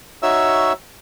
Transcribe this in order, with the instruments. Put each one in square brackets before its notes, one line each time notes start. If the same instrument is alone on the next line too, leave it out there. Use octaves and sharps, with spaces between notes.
[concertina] D#4 F#4 C#5 E5 E6